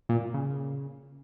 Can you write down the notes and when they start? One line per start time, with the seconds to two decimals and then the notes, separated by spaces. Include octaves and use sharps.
0.09 A#2
0.34 C#3